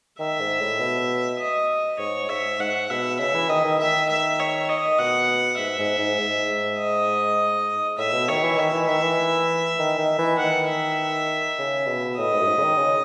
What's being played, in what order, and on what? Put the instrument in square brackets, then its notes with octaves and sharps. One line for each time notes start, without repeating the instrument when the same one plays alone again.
[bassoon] D#3 [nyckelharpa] E5
[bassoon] G#2
A2
B2
[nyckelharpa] D#5
[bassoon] G#2 [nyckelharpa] C#5
[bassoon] G#2 [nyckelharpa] E5
[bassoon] G#2 [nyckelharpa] F#5
[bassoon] B2 [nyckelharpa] E5
[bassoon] C#3 [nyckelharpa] E5
[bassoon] E3
[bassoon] D#3 [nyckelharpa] D#5
[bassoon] D#3
[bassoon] D#3 [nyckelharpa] E5
[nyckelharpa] E5
C#5
D#5
[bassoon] B2 [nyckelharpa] F#5
[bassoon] G#2 [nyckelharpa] E5
[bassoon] G#2
G#2
G#2
[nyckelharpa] D#5
[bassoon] A2 [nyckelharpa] E5
[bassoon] B2
[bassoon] D#3 [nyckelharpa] C#5
[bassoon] E3
[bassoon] D#3 [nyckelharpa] E5
[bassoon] E3
[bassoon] D#3 [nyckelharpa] E5
[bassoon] E3
D#3
D#3
E3
[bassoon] D#3 [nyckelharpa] F#5
[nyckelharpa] E5
[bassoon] C#3
B2
[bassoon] A2 [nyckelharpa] D#5
[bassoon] G#2
F#2
G#2
C#3
D#3
C#3